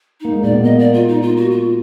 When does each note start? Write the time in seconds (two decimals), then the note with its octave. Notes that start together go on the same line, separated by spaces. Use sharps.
0.21 A#3 D#4
0.32 G#3
0.43 A#2 A#3 D5
0.53 B2 B3
0.64 A#2 A#3 D#5
0.79 D5
0.93 F4
1.08 D#4
1.22 F4
1.37 F#4
1.51 F4